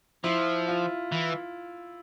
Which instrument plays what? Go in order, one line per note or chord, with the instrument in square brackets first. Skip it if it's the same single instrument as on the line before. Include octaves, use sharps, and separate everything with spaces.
[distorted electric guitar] F3 [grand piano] E4
[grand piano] F4
[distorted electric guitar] E3